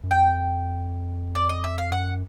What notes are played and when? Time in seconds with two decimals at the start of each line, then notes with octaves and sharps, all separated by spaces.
0.04 F#2
0.11 F2 G5
1.35 D5
1.49 D#5
1.64 E5
1.78 F5
1.91 F#2 F#5